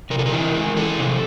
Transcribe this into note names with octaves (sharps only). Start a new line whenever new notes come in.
C3 A#4
A4
A#4
E3
G#3
E3 A4
C3